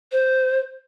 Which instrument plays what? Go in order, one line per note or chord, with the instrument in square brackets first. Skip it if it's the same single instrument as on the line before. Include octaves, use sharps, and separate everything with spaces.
[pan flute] C5